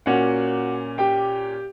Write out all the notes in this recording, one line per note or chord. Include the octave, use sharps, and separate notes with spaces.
A#2 A#3 C#4 F#4 F#5
G4 G5